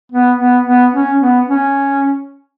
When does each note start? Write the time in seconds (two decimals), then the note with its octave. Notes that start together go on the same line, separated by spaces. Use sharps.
0.12 B3
0.39 B3
0.66 B3
0.94 C#4
1.20 B3
1.48 C#4